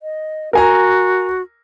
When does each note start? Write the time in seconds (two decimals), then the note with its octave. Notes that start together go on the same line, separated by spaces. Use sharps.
0.03 D#5
0.53 F#4 A#4 G#5 A#5